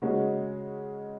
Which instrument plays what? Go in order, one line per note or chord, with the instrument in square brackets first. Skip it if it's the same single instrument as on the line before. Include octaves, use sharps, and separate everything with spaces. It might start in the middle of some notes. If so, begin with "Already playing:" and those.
[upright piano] C#3 G#3 C#4 F#4 C#5